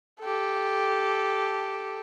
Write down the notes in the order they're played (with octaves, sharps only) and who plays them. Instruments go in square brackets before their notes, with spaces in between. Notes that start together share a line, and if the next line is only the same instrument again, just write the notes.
[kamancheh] G4 A4